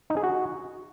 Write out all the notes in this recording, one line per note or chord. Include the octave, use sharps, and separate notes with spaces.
D#4
G#4
F#4